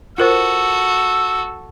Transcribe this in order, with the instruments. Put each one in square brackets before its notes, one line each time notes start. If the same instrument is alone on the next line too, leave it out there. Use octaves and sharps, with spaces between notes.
[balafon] F4 A#4 C5 [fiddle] F#4 A4 [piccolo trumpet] E6